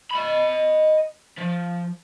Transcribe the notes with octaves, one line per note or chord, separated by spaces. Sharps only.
D#5 B5
F3